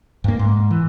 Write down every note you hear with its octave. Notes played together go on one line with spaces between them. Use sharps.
G2 A#3
G#2
E3